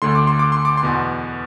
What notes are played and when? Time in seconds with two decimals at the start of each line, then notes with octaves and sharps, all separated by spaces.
0.02 D2 D3 A3 C6
0.15 D6
0.27 C6
0.39 D6
0.52 C6
0.65 D6
0.77 C6
0.83 E2 B2 B3